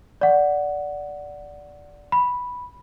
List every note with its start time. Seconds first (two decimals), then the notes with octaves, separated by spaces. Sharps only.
0.21 D5 F#5
2.12 B5